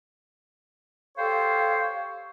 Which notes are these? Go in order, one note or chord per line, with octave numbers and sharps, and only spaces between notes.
G4 A4 C5 C#5 F5